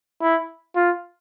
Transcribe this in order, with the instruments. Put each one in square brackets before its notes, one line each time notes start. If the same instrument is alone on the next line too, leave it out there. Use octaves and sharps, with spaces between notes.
[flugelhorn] E4
F4